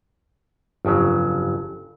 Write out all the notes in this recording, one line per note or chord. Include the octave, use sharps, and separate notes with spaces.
G1 F2 C#3 F#3